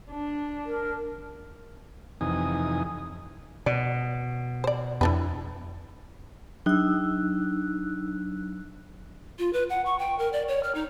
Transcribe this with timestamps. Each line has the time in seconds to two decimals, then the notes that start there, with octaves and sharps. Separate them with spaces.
0.11 D4
0.66 A#4
2.21 F2 C3 E3 D#4 G#5 D#6
3.66 B2 D5
4.64 C5 D5
5.01 F2 E3 D4 B4
6.66 F#3 D4 D#4 E6 F#6
9.39 F4
9.53 B4
9.70 F#5
9.86 C#6
9.99 G5
10.19 A#4
10.33 D5
10.48 C#5
10.63 F6
10.75 D#4